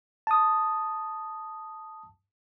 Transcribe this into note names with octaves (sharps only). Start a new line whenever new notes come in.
A5 D#6